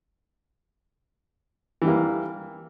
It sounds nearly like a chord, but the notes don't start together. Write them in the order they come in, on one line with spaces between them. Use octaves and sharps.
E3 G3 A#3